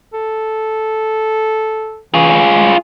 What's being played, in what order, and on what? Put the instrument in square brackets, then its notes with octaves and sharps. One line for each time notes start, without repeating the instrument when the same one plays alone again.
[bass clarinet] A4
[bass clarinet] E3 [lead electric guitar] F4 G#4
[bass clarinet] G#3